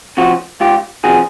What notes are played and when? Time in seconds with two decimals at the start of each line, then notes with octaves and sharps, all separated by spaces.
0.17 C3 F3 F#4
0.60 C#2 F4 G4
1.04 C3 F3 F#4 G#4